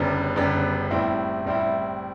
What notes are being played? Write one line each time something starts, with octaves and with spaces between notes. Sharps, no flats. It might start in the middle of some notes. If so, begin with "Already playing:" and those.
Already playing: F#1 F#2 D3 G3 B3
F#1 F#2 D3 G3 B3
A2 G3 C4 E4
A2 G3 C4 E4